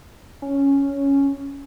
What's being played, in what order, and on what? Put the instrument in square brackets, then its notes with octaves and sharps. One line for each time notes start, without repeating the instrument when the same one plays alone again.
[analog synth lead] C#4